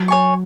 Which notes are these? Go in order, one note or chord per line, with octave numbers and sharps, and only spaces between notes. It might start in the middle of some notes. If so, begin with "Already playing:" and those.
Already playing: F#3
C#5 G#5 C#6